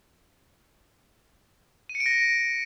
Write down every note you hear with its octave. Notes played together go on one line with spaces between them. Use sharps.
D#7
C#7
D7
A#6